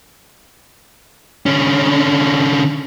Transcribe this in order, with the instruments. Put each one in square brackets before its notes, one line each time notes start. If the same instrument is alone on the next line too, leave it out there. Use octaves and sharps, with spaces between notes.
[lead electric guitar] D3 C#4